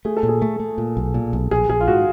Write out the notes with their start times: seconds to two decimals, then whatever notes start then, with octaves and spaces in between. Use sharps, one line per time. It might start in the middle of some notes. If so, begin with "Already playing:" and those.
0.05 A3 G#4
0.17 A4
0.23 A#2
0.28 G#4
0.42 A3
0.60 A3
0.78 A#2
0.97 B1
1.14 A#2
1.33 B1
1.51 A#1 G#4
1.69 A#1 G#4
1.80 F4
1.87 G#2 F#4